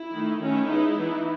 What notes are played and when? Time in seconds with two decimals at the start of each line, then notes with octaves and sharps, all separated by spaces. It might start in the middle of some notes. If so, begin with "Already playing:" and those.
Already playing: E4
0.12 D#3 A3 D#4
0.40 D#3 A3 C#4 E4
0.68 G#3 B3 D#4
0.97 E3 B3 D#4